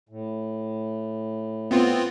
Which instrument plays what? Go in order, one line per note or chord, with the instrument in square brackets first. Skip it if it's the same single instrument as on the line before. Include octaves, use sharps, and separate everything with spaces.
[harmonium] A2
[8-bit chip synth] B3 C4 F4